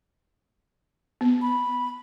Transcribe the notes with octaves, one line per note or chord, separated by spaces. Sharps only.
B3
B5